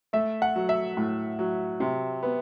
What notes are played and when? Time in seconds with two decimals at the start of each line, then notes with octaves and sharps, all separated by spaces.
0.13 A3 E5
0.42 F#5
0.56 F#3
0.69 E5
0.97 A2
1.39 F#3
1.80 C3
2.23 B3